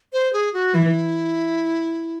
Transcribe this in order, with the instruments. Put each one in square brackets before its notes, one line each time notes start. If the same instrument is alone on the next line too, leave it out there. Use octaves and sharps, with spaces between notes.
[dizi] C5
G#4
F#4
[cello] E3 [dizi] E4